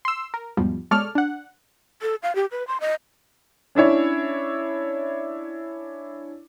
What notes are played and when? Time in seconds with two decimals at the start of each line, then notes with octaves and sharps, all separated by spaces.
0.05 C6 E6
0.34 A#4
0.57 E2 G#2 B2 F3 G3
0.91 B2 G#3 A4 C#5 D5 F6
1.15 D4 F#5
2.02 A4
2.23 F5
2.35 G4
2.51 B4
2.67 C6
2.80 D#5
3.75 C#4 D4 E4 C#5